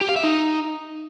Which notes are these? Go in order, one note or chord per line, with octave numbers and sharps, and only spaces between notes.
G4
F5
E5
D#4